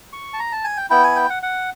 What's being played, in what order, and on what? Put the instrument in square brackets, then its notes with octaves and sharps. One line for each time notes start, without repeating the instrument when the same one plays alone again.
[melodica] C#6
A5
A#5
A5
G#5
G5
B3 E4 G5
G#5
G5
F#5
F#5